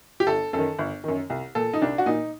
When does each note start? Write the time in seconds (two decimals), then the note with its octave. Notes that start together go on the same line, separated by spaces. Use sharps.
0.20 G4
0.27 G1 A4
0.53 F#2 D#3 A4
0.79 G1
1.04 F#2 D#3
1.30 C2
1.55 A#2 A4
1.73 D#4
1.82 C2 D4
1.98 F#4
2.06 A#2 D#4